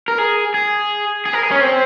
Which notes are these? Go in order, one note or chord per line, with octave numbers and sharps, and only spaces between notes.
A#4
G#4
G#4
G#4
A#4
G#4
C#4
C4